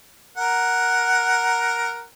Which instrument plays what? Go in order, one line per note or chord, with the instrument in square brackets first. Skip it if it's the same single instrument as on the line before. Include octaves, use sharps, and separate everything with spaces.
[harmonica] A#4 F#5